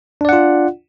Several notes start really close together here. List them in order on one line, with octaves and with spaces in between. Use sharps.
D4 D5 F#5 F4